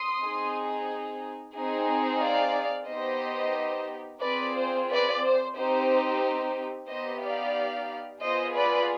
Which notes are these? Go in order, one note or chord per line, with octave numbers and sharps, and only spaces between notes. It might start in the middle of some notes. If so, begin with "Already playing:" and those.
Already playing: C6 D#6
C4 D#4 G#4
C4 D#4 G#4
D5 F5
B3 D#4 G4 C5 D#5
C4 F4 G#4 B4 D5
C5
B4 D5
C5
C4 D#4 G4 C5
B3 D#4 G4 C5 D#5
D5 F5
B3 F4 G#4 C5 D#5
B4 D5